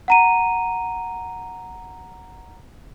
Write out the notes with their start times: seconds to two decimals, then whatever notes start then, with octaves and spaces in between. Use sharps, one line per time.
0.08 F#5 A#5 D#7